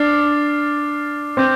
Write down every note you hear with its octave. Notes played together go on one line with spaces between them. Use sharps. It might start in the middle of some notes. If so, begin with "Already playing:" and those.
Already playing: D4 D6 F6 A6 C7
C4 D6 G6